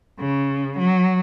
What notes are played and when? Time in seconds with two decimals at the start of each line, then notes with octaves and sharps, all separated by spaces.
0.19 C#3
0.79 F#3